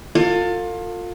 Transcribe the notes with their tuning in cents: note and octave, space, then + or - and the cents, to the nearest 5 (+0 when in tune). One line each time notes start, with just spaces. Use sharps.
F4 +25 A4 +40